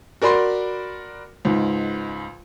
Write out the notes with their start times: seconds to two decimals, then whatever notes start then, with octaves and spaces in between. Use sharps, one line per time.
0.22 F#4 A#4 D5 B5 C6
1.45 C#2 G#2